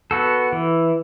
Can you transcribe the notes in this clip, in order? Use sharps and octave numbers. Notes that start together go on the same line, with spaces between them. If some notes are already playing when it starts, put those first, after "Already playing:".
B3 F#4 A4
E3